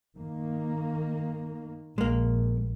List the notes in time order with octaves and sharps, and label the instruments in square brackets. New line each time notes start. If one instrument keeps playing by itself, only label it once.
[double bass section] D#3 A#3
[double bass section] A#1 [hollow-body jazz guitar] G#3 A#3